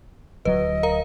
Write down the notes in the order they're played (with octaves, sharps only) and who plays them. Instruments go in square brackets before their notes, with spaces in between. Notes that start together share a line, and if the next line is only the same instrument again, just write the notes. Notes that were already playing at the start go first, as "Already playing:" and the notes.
[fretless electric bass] D1 F#3 [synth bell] B4 [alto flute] D#5
[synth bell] A#4 F5 A#5